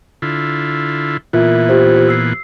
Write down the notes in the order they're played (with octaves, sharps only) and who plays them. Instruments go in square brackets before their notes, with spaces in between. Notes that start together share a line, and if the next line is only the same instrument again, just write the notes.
[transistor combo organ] D3 E4 F4
[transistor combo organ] A#2 E3 B3 [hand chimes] F4 A#4 E5
[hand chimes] F4 G4 C5
E6 C7